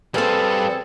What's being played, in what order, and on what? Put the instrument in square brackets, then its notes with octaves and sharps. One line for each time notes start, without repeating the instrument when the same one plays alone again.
[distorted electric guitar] G3 F5 [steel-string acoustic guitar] C4 G#4 [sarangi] A4 [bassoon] B4